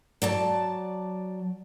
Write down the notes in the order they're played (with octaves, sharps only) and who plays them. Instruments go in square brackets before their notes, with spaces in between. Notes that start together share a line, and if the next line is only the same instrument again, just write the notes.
[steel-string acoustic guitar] F#3 D5 A5